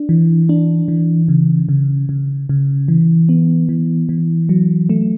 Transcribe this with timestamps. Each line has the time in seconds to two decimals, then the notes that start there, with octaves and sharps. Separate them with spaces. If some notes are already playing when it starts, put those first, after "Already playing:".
Already playing: D4
0.09 E3
0.49 D4
0.88 E3
1.28 C#3
1.69 C#3
2.09 C#3
2.49 C#3
2.88 E3
3.29 B3
3.69 E3
4.09 E3
4.49 F#3
4.89 A3